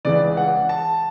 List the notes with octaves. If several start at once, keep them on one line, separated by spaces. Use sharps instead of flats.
C#2 C#3 E3 D5
F#5
A5